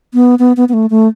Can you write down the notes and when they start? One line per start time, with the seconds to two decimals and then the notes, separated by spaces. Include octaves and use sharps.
0.14 B3
0.39 B3
0.57 B3
0.69 B3
0.73 A3
0.90 A3